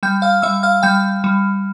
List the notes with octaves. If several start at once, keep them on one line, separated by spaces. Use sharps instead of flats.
G3 G5 G6
F5 F6
G3 E5 E6
F5 F6
G3 G5 G6
G3